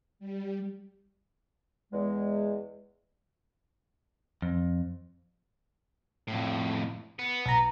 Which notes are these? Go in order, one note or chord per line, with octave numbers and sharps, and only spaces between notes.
G3
E2 G#3
F2
F2 A2
B3
B1 A#5